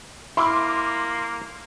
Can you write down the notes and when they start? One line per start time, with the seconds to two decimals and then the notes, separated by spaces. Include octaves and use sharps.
0.37 A#3 E4 C6 D6 F6